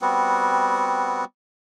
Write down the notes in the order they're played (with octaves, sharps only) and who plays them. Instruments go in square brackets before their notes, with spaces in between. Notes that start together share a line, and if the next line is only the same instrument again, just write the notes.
[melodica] G3 B3 C4 F#4